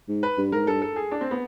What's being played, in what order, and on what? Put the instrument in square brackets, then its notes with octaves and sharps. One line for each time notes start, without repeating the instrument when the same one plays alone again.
[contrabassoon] G#2
[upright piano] B4
[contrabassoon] G2
[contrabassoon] G#2 [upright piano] A#4
[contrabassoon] G2 [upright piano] A4
[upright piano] A4
G#4
D4
C4
B3